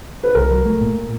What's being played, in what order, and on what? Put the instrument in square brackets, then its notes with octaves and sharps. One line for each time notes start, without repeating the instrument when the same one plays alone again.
[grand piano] B4
[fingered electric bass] C2 [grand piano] A#4
[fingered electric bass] F#3
A3
A#2